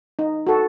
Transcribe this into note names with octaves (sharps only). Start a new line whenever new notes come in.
D#4
F#4 A4